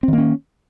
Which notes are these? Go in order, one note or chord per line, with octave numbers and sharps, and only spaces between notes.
D#3 A#3 C4 C#4